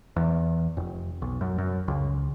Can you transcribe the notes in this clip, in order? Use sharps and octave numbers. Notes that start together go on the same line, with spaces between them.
E2
F1
B1
F#2
F#2
C#2